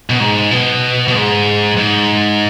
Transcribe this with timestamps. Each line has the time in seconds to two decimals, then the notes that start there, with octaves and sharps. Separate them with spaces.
0.10 B2
0.20 G#2
0.51 B2
1.08 B2
1.14 G#2
1.77 G#2